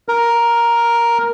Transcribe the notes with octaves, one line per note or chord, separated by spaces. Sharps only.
A#4